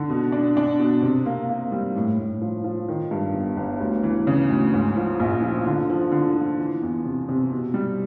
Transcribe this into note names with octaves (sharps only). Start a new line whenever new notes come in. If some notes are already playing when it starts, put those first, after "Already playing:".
Already playing: D3
B2
D4
D4
B2
C3
A#3
A#3
G3
A2
A2
F3
F3
D#3
G2
G1
G1
D2
E3
C#3
D2
G#2
F3
A#1
F3
D3
F3
D3
F3
E3
E2
C3
C3
B2
G3